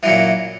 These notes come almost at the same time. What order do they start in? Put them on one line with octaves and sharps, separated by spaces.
E3 F#2 A#2